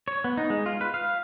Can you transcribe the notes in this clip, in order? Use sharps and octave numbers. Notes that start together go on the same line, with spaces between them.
C#5
B3
D#4
G#3
F4
B4
F5